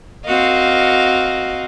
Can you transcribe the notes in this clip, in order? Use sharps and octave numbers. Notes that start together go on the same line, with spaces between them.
C4 F#4 A#4 D#5 F5